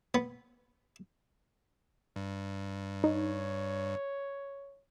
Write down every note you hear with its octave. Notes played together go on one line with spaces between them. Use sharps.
B3
G2
D#4 C#5